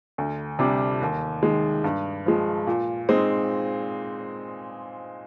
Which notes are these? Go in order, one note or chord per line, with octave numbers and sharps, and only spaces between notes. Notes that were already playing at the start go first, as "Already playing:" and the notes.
D2
C3 G3 D4
D#2
D#3 G#3
G2
F3 G#3
A#2
G#3 C4 D#4